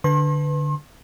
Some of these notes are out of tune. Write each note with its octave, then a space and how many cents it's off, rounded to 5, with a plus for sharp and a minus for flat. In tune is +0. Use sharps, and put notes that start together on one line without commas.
D3 +0 B4 +10 C6 +40